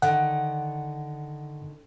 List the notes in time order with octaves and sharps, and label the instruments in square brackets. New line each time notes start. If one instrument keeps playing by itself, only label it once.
[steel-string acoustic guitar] D3 D#3 [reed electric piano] F#5